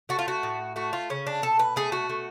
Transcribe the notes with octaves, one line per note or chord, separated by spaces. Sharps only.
A3 F#4
F4
F#4
A2
A3 F#4
F4
C#3 C#4
D4
B2 A4
B4
A3 G#4
F#4
A3